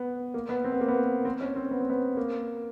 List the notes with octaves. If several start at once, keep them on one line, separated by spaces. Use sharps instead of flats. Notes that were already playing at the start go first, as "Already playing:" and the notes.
Already playing: B3
A#3
B3
C4
B3
A#3
B3
C4
C#4
C4
B3
C4
B3
A#3